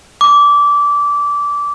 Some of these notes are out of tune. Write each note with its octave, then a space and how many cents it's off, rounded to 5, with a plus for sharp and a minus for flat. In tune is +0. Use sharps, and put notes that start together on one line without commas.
D6 -20